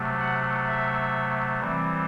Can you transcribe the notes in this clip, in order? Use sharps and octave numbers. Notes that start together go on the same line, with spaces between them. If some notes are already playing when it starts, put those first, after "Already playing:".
Already playing: C3 F#3 A3
F#5
E5
E3 G3 C4